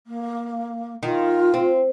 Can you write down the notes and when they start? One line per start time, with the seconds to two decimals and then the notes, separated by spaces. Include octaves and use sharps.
0.07 A#3
1.03 D#3 F4
1.54 C4